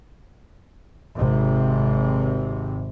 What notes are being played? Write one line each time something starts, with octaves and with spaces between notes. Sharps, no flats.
G#1 C3